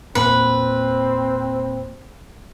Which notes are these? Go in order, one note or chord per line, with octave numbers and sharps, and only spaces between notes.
E1 A#2 C4 B4